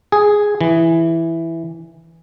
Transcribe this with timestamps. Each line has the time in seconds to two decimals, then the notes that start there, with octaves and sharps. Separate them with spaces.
0.12 G#4
0.61 E3